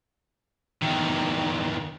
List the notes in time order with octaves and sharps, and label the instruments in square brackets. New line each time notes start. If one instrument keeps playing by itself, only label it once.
[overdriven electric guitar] E2 D#3